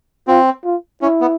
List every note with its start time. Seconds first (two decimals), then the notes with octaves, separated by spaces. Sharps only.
0.28 C4 F4
0.65 F4
1.02 C#4 E4
1.21 B3